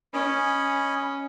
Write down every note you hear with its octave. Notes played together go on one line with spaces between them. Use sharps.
C#4 D#5 G#5 B5